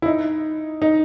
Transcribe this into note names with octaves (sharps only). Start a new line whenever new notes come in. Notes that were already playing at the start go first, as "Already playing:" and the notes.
E4
D#4
D#4